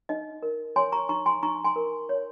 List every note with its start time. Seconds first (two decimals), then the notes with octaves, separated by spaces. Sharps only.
0.09 D#4 D#5
0.43 A#4
0.76 C#5 G#5 C6
0.92 A#5 C#6
1.09 D#4 A#5 C#6
1.26 G#5 C6
1.43 D#4 A#5 C#6
1.65 G#5 C6
1.76 A#4
2.09 C#5